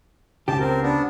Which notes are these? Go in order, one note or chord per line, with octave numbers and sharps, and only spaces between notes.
C#2 C#3 G4 A5
C4 A#4
B3 D4